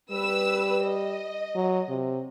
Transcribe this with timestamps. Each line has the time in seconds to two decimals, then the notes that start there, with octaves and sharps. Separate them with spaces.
0.11 G3 B4 E6
0.85 D#5
1.55 F#3
1.89 C3